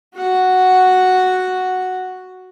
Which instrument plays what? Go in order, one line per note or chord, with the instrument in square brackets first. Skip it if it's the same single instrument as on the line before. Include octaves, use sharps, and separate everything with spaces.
[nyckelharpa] F#4 F#5